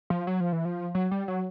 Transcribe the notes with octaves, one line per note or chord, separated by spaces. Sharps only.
F3
F#3
F3
E3
F3
F#3
G3
F#3